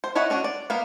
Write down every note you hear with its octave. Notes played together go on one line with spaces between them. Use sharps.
C5
E4 C#5 D#5 F#5
C#4 D4 F#4
D5
A#3 B3 F5